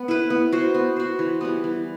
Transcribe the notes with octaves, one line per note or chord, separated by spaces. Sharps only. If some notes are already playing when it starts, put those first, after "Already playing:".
Already playing: B3
E4 B4
B3
F#4 C5
B3
F#4 C5
E3
G3 B3
E3